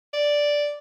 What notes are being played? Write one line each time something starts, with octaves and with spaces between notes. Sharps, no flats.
D5